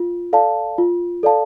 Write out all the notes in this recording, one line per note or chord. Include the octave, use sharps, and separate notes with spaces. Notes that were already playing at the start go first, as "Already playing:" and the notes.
Already playing: F4
A4 D5 F5 A5
F4
A4 D5 F5 A5